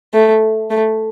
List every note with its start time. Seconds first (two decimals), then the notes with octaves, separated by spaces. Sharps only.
0.14 A3
0.70 A3